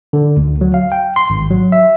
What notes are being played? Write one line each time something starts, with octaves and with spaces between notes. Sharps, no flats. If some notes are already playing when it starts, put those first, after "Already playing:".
D3
D2
F#3
F5
G5
C6
G#1
F#3
E5